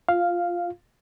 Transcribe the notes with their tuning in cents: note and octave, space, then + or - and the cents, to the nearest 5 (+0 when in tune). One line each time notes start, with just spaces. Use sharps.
F4 +0 F5 +0